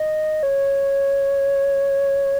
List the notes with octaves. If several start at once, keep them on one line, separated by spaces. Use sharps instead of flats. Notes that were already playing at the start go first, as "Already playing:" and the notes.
Already playing: D#5
C#5